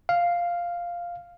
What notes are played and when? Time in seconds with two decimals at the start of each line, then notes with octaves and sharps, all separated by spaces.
0.09 F5